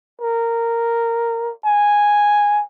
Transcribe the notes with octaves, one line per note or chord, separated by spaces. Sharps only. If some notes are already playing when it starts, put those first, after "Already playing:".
A#4
G#5